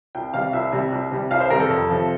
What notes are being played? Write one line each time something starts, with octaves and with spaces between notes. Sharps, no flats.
C2 G5
C3 G3 F5
C2 E5
C3 G3
C2
C3 G3
C2 F5
C5
C3 G3 A#4
A4
F2
C3 F3